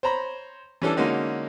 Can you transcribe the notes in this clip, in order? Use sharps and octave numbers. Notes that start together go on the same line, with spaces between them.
C5 C#5 A#5 B5
E3 G3 C#4 D4 A4
D3 G#3 A#3 C#4 D#4 F#4